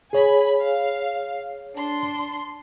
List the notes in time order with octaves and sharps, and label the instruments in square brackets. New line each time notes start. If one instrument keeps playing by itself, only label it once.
[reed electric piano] G#4 C#5 [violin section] G#5 B5
[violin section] F5
D4 C6